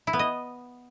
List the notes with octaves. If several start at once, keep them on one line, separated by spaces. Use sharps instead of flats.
E4
B3
D#5